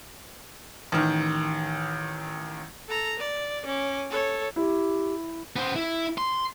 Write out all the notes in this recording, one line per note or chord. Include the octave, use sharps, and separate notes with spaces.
A1 D#3
A4 A#5
D5
C#4 D6
A4 C#5
E4 G4
B3 C5
E4
C6